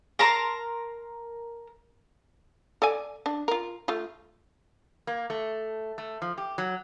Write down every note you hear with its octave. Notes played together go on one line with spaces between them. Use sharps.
A#4 A5 A#5 C6
A4 D5 G#5
D4
F4 A#4
A3 F4
A#3
A3
A3
F3
G4
F#3